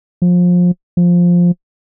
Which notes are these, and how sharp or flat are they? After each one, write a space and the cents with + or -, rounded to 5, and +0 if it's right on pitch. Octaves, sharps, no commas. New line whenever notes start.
F3 +25
F3 +5